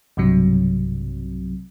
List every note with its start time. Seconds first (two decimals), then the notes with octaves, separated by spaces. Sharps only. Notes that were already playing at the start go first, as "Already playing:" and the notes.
0.17 B1 G2 C3 F#3